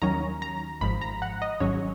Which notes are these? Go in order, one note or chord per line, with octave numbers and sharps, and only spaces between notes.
D#2 D#3 F#3 C#4 A#5
A#5
G#1 G#2 F3 B5
A#5
F#5
D#5
G#1 G#2 F#3 C#4 C#5